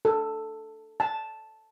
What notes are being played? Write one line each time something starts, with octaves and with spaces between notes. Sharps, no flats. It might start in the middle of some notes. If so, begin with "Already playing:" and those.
A4
A5